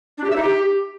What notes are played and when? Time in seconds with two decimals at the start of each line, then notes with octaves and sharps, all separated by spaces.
0.18 D4
0.24 G4
0.30 E5
0.36 D#4
0.42 G4